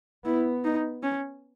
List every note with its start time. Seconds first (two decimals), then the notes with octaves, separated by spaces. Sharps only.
0.25 B3 E4
0.65 D#4
1.03 C#4